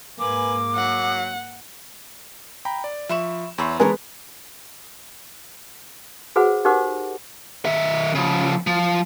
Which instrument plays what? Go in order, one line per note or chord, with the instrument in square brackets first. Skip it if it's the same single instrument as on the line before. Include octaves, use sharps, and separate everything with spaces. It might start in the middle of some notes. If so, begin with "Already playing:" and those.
[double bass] G#2 A#3 [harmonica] B4 G#5 [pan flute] D6
[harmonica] F#3 [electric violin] F#5
[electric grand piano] G5 A#5 B5
D5
[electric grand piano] F3 E7 [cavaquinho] E5 B5 C#6
[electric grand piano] E2 C6 [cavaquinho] C#5 E5 B5
[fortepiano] G#3 B3 [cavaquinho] A4 A#4 C#5 [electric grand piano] G#5 B5
[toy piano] F#4 G#4 B4 C5 F#5
D#4 G4 A#4 C5 F#5 D6
[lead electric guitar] D#3 E5
C#3 F3
F3